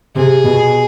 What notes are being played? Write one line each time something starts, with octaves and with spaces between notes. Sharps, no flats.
C3 G#4
B2